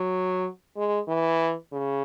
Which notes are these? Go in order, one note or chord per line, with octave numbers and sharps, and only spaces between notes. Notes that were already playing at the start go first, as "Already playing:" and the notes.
Already playing: F#3
G#3
E3
C#3